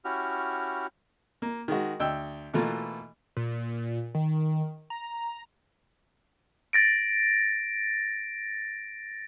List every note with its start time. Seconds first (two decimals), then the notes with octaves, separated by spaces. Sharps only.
0.05 C#4 E4 F#4 G4 F6
1.42 A#3
1.68 D#3 G#3 F#4
2.00 D2 G5 E6
2.54 B2 E3 A3 A#3 F4
3.37 A#2
4.15 D#3
4.90 A#5
6.73 A6 A#6 D7